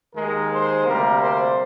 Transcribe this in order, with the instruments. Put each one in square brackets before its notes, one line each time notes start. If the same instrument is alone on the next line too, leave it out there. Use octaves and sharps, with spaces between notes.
[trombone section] D#2 D#3 G#3 A#4
C5
D2 C3 G3 A#3 A#4
C5